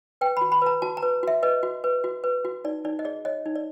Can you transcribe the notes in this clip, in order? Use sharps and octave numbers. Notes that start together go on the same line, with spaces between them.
B4 G5
F#4 B5
B5
B4 A#5
F#4 A5
A#5
B4
F#4 E5
B4 D#5
F#4
B4
F#4
B4
F#4
D#4 D5
D#4 D5
D#5
G#4 D5
C#5 D#5
D#4
D5